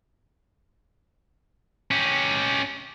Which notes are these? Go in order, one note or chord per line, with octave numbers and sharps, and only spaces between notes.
C#4 G4